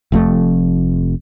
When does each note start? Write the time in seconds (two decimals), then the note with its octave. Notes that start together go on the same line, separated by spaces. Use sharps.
0.12 F1 F2 A3